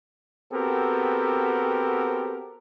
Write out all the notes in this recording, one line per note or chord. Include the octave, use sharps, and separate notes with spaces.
B3 C4 F#4 G4 A4 A#4